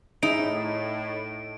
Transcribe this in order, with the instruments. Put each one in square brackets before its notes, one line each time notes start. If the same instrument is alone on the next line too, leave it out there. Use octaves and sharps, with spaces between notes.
[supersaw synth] A2 [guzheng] D#4 [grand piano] E4 G#4 E5 [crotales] D7